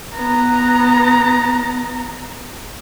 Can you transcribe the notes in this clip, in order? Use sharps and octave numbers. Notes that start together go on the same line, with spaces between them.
B3 A#5